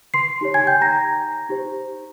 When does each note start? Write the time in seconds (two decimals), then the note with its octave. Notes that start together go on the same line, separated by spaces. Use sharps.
0.14 C6 C7
0.41 D#4 G4 C#5
0.54 G#5 G#6
0.67 G5 G6
0.81 A#5 A#6
1.49 D#4 G4 C5